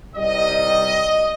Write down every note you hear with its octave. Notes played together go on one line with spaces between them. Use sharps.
C2 C3 D#3 G3 D#5